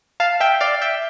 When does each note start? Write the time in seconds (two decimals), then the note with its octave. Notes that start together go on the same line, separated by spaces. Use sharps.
0.20 F5 A5
0.40 E5 G5
0.60 D5 F5
0.82 E5 G5